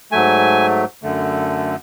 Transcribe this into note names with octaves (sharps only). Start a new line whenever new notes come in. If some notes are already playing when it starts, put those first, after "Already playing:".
G#2 F#3 A3 G#5
F#2 D3 A3